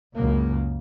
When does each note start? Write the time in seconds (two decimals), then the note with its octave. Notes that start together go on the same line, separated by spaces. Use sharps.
0.14 C#2 F#2 C#3 A#3